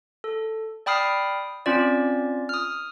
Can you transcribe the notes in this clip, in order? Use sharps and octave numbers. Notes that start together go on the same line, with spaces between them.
A4
D5 G5 B5 D#6 F6 C7
C4 C#4 F4 D5
D#6 F6